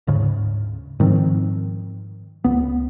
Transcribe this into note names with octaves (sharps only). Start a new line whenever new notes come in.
D1 G#2 C#3
G#2 D#3 F3 C4
C#2 B3